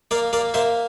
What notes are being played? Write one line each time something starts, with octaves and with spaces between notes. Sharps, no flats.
A#3 D5 F5
A#3 D5 F5
A#3 C5 E5